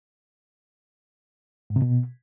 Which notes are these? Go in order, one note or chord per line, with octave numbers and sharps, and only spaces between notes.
G#2
C3
B2